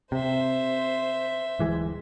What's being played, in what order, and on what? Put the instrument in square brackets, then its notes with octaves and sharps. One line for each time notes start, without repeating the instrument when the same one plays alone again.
[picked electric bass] C3 [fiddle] C5 E5
[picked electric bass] D1 E3 G#3